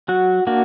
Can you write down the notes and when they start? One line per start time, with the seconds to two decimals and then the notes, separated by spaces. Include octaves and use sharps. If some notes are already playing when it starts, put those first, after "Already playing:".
0.08 F#3 F#4
0.47 A#3 D4 F#4